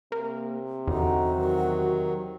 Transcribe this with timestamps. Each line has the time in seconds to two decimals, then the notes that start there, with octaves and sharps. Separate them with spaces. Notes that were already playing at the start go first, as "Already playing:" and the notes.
0.12 C3 A#3
0.87 E2 D3 D#4 F#4
1.35 D#3 F#3